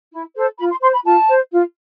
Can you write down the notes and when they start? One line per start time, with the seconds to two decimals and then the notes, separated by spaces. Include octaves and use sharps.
0.12 E4
0.35 A4 C5
0.58 F4 B5
0.70 C6
0.81 C5 C6
0.93 B5
1.05 F4 A5
1.28 C5
1.51 F4